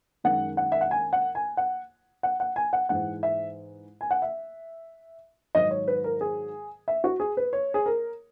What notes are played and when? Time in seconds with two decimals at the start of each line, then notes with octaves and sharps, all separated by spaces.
0.24 F#2 D#3 G#3 F#5
0.57 F#5
0.72 E5
0.81 F#5
0.91 G#5
1.13 F#5
1.35 G#5
1.57 F#5
2.23 F#5
2.40 F#5
2.56 G#5
2.73 F#5
2.89 G#2 E3 G#3 F#5
3.23 E5
4.01 G#5
4.11 F#5
4.22 E5
5.55 G#2 D#3 F#3 D#5
5.71 C#5
5.88 B4
6.04 A#4
6.21 G#4
6.88 E5
7.04 F#4
7.20 G#4
7.37 B4
7.53 C#5
7.74 G#4
7.86 A#4